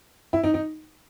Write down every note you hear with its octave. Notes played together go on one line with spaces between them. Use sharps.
E4
D#4
D#4